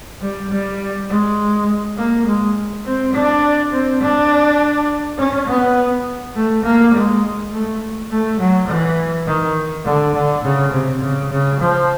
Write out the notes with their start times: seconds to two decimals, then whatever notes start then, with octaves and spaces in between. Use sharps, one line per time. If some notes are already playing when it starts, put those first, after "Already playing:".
0.22 G3
0.51 G3
1.10 G#3
1.97 A#3
2.26 G#3
2.85 C4
3.13 D4
3.71 C4
4.01 D4
5.18 C#4
5.47 B3
6.35 A3
6.64 A#3
6.93 G#3
7.52 A3
8.10 A3
8.40 F#3
8.68 E3
9.27 D#3
9.85 D3
10.15 D3
10.44 C#3
10.72 C3
11.01 C#3
11.31 C#3
11.60 F3